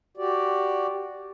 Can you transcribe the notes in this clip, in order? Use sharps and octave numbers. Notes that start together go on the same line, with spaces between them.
F#4 G4 D5